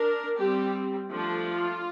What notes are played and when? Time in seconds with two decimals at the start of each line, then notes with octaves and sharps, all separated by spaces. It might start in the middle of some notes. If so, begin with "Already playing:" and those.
Already playing: D4 A#4
0.39 G3 C4 G4
1.10 F3 A3 D4
1.45 F4